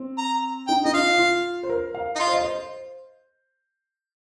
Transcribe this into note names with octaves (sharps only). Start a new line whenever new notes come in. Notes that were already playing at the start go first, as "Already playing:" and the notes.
Already playing: C4
A#5
D#4 G5
D#4 D#5
F4 F5
F4
C5
A#4
F5
D#4
F4 D#5
C5
D#5
C5